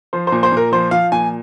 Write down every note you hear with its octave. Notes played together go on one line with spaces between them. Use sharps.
F3 C5
A#2 C5
C5
A#2 A#4
F3 C5
F3 F5
A#2 G#5